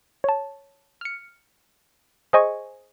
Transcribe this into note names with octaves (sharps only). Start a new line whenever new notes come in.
C#5 A5
F6 C#7
G#4 C5 D#5 G#5 C#6